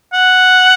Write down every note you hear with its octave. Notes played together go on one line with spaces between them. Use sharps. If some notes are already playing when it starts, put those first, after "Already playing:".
F#5